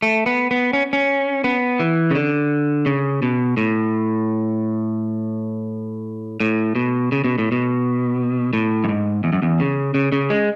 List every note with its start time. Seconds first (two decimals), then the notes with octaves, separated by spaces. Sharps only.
0.02 A3
0.26 B3
0.51 B3
0.73 C#4
0.93 C#4
1.44 B3
1.80 E3
2.11 C#3
2.15 D3
2.86 C#3
3.22 B2
3.57 A2
6.40 A2
6.75 B2
7.12 C#3
7.24 B2
7.38 A2
7.52 B2
8.53 A2
8.84 F#2
8.89 G#2
9.24 E2
9.33 F#2
9.42 E2
9.60 C#3
9.94 C#3
10.12 C#3
10.30 G#3